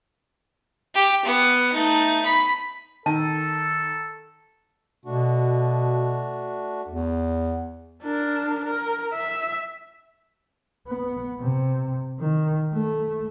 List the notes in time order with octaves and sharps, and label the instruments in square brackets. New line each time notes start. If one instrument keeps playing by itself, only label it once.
[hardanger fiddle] G4
B3 F#5
A3 D#4
B5
[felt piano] D#3 [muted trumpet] A4 [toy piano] A5
[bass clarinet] B2 [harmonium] A3 D4 F#4
[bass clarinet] E2
[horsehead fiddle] D4 A#4
A#4
E5
[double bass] B3
C3
D#3
A3